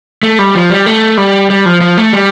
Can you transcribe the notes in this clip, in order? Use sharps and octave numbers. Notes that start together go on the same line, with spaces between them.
A3
G3
F3
G3
A3
G3
G3
F3
F3
A3
G3